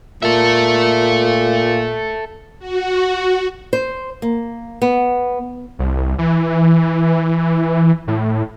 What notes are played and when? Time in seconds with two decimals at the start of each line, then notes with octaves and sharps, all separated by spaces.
0.23 A#2 A4 E5
2.59 F#4
3.73 C5
4.22 A#3
4.82 B3
5.79 C2
6.19 E3
8.08 A2